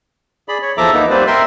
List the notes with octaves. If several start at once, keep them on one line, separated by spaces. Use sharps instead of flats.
G#4 D5 B5
C#5
E2 F3 A4 E5 A#5 D6
A#3 B3 D#4
G3 A#3 C4 B4 C5 D5
A#4 E5 G5 C6